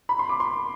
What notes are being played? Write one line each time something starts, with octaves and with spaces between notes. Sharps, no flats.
B5
C6
D6
C6